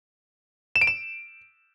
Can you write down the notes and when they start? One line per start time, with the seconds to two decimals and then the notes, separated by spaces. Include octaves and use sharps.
0.76 E7
0.81 D7
0.87 E7